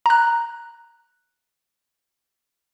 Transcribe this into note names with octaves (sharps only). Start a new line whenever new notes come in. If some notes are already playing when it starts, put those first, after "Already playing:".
A#5 F#6